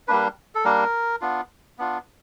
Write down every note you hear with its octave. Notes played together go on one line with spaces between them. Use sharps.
G3 A#3 D4 B4
A4
G3 A#3 D4 A#4
B3 D4 F4
B3 D4 F4